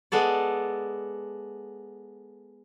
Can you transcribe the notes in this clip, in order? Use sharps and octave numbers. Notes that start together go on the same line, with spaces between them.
G#3 B3 A4 D5